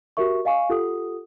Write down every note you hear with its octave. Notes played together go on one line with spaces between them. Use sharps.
F#4 G4 A#4 E5 C#6
D#5 F5 G#5 C#6
F4 G4 A4 F#5 D#6